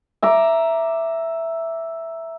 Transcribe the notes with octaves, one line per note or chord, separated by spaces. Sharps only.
E5 A#5 D6